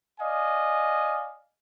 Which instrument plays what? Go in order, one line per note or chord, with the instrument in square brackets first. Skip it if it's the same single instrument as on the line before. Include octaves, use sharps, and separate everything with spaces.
[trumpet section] D5 D#5 F5 G#5